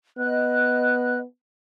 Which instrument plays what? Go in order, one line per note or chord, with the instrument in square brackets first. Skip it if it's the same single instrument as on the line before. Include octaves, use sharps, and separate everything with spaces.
[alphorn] B3 [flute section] D#5 F#6